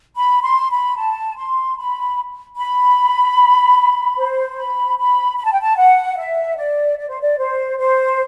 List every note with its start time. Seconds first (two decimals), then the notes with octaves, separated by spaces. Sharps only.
0.16 B5
0.42 C6
0.70 B5
0.96 A5
1.36 C6
1.77 B5
2.56 B5
4.17 C5
4.57 B5
4.98 B5
5.37 B5
5.45 A5
5.52 G5
5.61 A5
5.77 F#5
6.17 E5
6.57 D5
6.98 D5
7.08 C5
7.20 D5
7.38 C5
7.78 C5